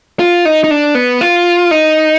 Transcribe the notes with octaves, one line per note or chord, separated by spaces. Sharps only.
F4
D#4
D#4
D4
B3
F4
D#4